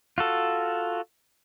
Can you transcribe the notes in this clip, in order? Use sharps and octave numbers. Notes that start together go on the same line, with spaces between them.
F4 F#4 A4